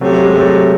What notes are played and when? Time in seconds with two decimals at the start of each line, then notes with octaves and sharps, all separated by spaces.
0.01 C3 F#3 A3
0.12 F#3
0.24 G#3
0.36 F#3 A3
0.47 F#3